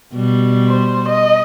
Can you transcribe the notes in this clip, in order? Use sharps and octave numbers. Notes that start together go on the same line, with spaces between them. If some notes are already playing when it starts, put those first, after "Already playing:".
B2 G3
C5
D#5